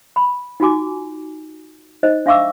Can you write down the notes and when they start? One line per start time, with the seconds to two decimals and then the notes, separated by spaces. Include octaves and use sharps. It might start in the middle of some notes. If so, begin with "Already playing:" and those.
0.16 B5
0.60 D#4 F4 F#4 G#5 D6
2.03 D#4 C5 D#5
2.26 D4 E5 F5 C#6 D6 E6